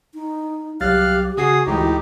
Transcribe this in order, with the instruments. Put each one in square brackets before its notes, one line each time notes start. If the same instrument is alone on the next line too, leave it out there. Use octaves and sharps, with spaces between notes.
[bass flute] D#4
[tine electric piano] C2 F#3 A6 [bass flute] G4 [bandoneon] F5 F6 F#6
[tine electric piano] C#3 F#5 C7 [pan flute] F#4 [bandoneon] G#4 D#6
[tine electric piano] D2 G#3 [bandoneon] A2 D#4 G4 [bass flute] E3